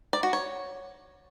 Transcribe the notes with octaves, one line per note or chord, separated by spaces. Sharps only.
D5
F#4
C#5